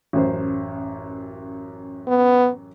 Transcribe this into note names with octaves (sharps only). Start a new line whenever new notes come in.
A1 F#2 C5
B3